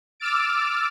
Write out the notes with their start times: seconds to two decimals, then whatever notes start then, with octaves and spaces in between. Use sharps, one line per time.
0.20 D6 E6 F6 A6 D7